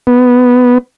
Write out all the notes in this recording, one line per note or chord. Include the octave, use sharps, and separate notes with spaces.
B3